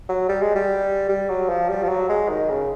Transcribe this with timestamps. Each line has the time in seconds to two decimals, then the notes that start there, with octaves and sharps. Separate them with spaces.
0.09 F#3
0.29 G3
0.42 G#3
0.56 G3
1.09 G3
1.29 F#3
1.49 F3
1.69 G3
1.84 F3
1.89 F#3
2.09 G#3
2.29 D#3
2.49 C#3